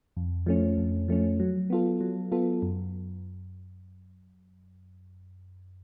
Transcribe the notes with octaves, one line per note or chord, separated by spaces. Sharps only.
F2
F3 A3 C#4
F2
F3 A3 C#4
F#3
B3 F4 A4
F#3
B3 F4 A4
F#2